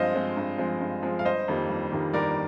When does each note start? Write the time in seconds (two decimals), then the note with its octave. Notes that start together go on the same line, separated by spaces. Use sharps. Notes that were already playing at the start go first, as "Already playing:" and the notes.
Already playing: G2 F3 G#3 C4 C5 D#5 F5
0.14 F3 G#3 C4
0.37 G2
0.58 F3 G#3 C4
0.81 G2
1.03 F3 G#3 C4
1.19 F5
1.25 G1 C5 D#5
1.48 F2 D#3 G3 A#3
1.69 G1
1.92 F2 D#3 G3 A#3
2.13 G1 A#4 D5